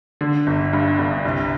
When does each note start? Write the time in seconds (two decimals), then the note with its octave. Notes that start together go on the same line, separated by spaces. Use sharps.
0.21 D3
0.47 G1
0.73 G2
0.99 G1
1.25 C2